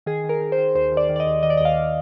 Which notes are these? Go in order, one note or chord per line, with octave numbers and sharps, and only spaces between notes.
D#3 G#4
D#3
A#4
D#3
C5
D#3
D#2 C5
D#3
D5
D#3
D5
D#5
D#2
D#3 D#5
D5
D#5
D#2 F5